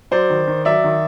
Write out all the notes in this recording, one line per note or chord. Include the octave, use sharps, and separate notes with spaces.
F#3 C5 D5
D#3
D#3
F#3 D5 E5
D#3